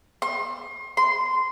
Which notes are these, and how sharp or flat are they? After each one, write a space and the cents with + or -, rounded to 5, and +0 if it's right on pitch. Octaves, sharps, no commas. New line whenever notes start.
C6 +35
C6 -15